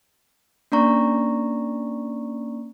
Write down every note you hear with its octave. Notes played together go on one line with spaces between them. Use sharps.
A#3 C#4 D4 D5 A#5 C#6